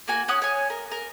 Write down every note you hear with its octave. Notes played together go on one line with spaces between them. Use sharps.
A#3 F#4 G#5
C#4 F#5 C#6 D#6
C#5 G#5
A#4
A#4